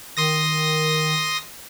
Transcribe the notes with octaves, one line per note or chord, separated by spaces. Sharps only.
D#3 C6 D#6 A#6